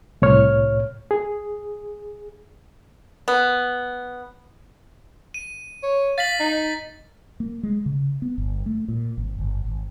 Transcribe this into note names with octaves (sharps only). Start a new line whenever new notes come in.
C2 A2 C#5 F6
G#4
B3
D#7
C#5
F5 A6 B6 F#7
D#4
A#3
G#3
C#3
B3
G1
A3
A#2
G#1
G1
G#1